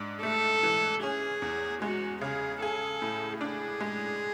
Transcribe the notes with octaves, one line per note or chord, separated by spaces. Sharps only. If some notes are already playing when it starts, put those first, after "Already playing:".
Already playing: G#2 D4
A3 A4
E3
C#4 G#4
E2
G#3 F#4
C#3 G#4
G#4 A4
A2
D4 G#4
G#3